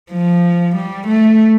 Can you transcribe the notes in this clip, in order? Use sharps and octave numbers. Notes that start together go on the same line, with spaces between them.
F3
G3
A3